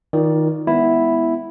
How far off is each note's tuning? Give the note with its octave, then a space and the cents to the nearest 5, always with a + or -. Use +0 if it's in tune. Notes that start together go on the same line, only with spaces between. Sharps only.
D#3 +20 F4 +0 D5 +0
G#3 -10 B3 +0 E4 +0